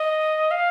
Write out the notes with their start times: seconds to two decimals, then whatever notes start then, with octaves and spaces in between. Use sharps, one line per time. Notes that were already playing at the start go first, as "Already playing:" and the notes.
Already playing: D#5
0.51 F5